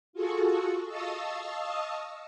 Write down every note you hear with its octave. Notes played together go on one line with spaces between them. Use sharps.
F4 F#4 G#4 A4 C#6
D#5 F5 A5 C#6 D#6 E6